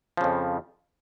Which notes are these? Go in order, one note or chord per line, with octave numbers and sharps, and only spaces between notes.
F2 C#3 F3